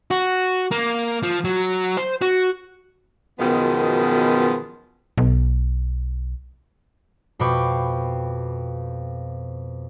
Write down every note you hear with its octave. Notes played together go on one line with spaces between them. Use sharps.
F#4
A#3
F3
F#3
C5
F#4
F#2 B2 D#3 F3 G#3 B3
B1
F2 B2 G5 B5 C#6 D6